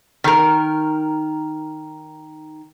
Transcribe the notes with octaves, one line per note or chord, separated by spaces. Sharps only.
D#3 A#4